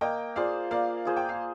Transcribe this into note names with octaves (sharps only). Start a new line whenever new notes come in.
A#3 D#5 G5
F4 G#4 C5 D5 F5
A#3 D5 F5
F4 G#4 C5
G5
F5